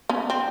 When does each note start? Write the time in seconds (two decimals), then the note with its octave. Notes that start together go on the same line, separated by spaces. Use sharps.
0.09 B3 C#4
0.30 C4